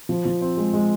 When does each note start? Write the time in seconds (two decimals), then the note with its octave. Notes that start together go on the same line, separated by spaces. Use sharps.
0.09 F3
0.25 F3
0.41 C4
0.57 G#3
0.73 G#3